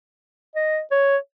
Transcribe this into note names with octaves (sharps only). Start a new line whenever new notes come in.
D#5
C#5